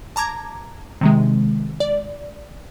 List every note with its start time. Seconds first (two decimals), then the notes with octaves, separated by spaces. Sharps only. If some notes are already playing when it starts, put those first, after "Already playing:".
0.16 A5 A#5 D6 G#6
1.01 C3 D#3 G#3
1.80 D5